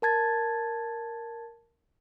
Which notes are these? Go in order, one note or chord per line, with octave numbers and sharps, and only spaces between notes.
A#4 A5 G#6 A6